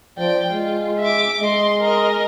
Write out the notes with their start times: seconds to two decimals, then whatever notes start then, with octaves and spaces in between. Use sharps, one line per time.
0.18 F3 D5 G5
0.51 G#3 F4
1.00 E5 D6
1.41 G#3 D#5 C6
1.80 A#4 D#5